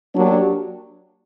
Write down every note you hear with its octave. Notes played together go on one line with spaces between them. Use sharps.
F#3 A#3 D4 G4